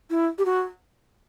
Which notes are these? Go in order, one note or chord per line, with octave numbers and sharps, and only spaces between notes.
E4
G4
F#4